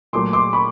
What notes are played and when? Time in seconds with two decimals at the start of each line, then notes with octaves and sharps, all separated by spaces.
0.13 A#2 F#3 A3 C6 D6
0.33 C6 D6
0.53 B5 C#6